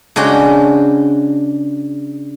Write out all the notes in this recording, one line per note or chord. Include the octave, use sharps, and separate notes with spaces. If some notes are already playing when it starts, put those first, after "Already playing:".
C#3 G#3 D4 F#4 G5